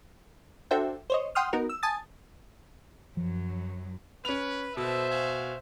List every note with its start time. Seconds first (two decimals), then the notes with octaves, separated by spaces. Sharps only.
0.71 D4 F#4 A4 C5 E5 G5
1.10 C5 C#5 D#5
1.35 F#5 G5 C6 D#6 F6
1.53 B3 D#4 F#4 A#4
1.69 E6
1.83 G#5 A5 D#6 A6
3.17 F#2 F3 F#3
4.25 C#4 B4 F7
4.77 B2 A4 B4 C5 E5
5.10 F#4 F5 G#5